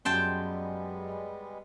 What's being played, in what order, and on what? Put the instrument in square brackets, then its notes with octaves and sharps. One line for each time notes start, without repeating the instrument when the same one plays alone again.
[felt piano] F#2 [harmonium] G3 G#3 B3 [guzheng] G5 A5 C6